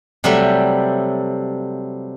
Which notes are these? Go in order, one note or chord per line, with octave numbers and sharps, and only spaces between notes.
C3 F#3 G3 A3 E5